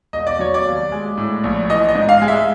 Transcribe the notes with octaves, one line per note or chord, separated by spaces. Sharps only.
E1 D#5
D5
F#3 C#5
D5
D#2
G#3
A2
A#1
E3 D#5
D#5
G#2
F5
G#3
E5